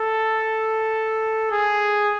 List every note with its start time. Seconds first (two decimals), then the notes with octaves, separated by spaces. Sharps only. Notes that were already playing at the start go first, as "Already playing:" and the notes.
Already playing: A4
1.51 G#4